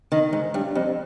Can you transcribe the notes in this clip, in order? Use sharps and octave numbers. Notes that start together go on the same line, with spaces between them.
D#3
G#2
G2
F2